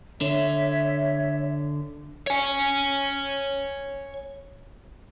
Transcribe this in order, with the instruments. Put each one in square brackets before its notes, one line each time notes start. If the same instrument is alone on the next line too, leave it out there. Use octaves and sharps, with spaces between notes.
[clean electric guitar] D3 [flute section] C#5 E5
[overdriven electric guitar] C#5 G#5